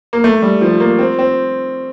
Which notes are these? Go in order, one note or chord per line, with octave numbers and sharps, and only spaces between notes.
A#3
A3
G3
F3
A#3
C4
C4